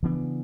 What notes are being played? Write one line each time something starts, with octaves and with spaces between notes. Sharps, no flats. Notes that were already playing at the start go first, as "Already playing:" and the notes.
C#3 E3 B3 D4